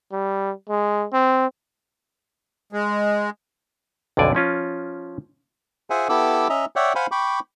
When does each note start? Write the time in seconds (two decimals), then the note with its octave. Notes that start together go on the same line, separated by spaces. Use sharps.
0.12 G3
0.69 G#3
1.13 C4
2.73 G#3
4.17 B1 F2 D3 D5 G#5
4.35 F3 C#4 F4
5.90 F4 G#4 C5 E5 F#5 G#5
6.09 B3 E4 G4 A4 D6 E6
6.50 C#4 D#5 E5 A#5
6.76 C#5 D5 E5 F#5 G5
6.95 C5 F5 F#5 G#5 B5 C6
7.11 G5 B5 C#6 D6